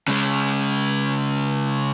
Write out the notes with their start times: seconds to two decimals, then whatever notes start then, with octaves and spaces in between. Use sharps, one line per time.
0.08 C#3 G#3